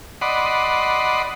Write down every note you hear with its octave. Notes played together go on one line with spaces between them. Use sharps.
D5 D#5 F#5 B5 C6